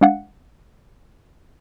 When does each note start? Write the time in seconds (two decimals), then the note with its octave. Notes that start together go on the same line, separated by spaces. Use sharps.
0.01 G#3 D4 F5 F#5